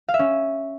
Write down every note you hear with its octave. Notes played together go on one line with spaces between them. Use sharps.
F5
E5
C#4